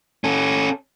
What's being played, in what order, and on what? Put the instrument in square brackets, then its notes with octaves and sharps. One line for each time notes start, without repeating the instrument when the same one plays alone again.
[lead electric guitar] C#4 A4